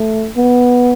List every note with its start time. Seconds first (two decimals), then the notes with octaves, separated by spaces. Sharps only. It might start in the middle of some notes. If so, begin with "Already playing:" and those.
Already playing: A3
0.36 B3